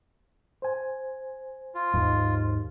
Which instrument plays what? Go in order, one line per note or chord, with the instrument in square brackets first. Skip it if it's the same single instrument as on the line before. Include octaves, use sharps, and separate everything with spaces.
[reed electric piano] C5 G#5
[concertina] F4
[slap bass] D#2 G#2